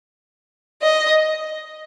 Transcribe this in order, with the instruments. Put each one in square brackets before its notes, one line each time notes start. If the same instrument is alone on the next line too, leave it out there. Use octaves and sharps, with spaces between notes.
[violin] D#5